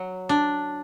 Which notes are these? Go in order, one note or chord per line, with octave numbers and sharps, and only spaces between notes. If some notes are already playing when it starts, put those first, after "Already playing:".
Already playing: F#3
D4